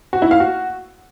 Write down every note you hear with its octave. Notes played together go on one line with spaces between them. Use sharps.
F#4
E4
F5
F#4